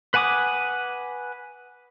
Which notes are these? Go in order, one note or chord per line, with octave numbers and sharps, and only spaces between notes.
B4 F#5 G#5 D6 D#6